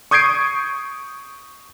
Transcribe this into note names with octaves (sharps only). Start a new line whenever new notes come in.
C#6 D#6 G6 G#6 C7 D7